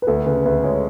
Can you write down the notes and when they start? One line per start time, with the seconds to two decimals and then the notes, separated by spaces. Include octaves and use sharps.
0.02 B4
0.07 D2 A4
0.26 C#3 B4
0.45 D2 B4
0.64 G#3 C#5